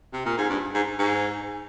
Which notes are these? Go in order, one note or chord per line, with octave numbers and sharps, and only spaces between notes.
C3
A#2
G#2
G2
G#2
G#2